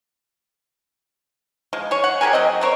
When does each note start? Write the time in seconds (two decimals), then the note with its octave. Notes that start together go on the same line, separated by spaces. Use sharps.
1.73 F3 G#3
1.91 G#4 C#5
2.04 F#5
2.21 G4 G#4 A#4 G#5
2.33 F#3 C4 D#5
2.61 A3 A#4 C5 C#5